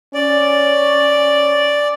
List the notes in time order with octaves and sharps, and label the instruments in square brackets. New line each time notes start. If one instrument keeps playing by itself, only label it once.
[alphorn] C#4 [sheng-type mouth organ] D5